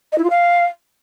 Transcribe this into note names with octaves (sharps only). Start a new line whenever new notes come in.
D#5
E4
F4
F5